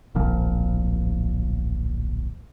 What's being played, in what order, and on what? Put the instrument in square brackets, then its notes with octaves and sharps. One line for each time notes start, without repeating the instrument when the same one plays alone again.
[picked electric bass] D1 A#1 A#2 F3